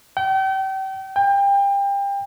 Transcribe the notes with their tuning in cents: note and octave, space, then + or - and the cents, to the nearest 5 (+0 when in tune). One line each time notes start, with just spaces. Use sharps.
G5 -35
G5 +30